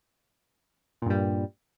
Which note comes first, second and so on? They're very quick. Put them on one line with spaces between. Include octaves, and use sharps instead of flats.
A#2 G2 G3